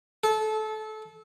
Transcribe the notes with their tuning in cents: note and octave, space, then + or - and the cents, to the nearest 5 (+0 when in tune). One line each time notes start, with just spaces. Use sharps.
A4 -25